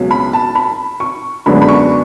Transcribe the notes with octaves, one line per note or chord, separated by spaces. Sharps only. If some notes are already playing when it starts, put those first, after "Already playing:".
Already playing: C#2 B2 F#3 C#4
B5
A5
B5
C#6
F#2 D3 G#3 B3 D4 B5
B5
C#6